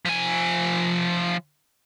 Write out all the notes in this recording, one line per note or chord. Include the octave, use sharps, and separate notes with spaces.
F3 G#5